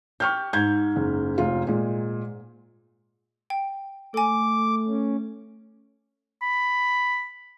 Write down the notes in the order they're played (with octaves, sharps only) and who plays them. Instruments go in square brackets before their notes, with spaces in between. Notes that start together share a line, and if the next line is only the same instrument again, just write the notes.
[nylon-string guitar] G4 [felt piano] C#6 F6 G6
[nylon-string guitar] G#2 [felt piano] G6 G#6
[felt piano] F#1
F1 F4
A#2 G#3
[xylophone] G5
[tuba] A3 [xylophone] A4 G#5 [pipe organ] D6
[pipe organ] C#4
[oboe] B5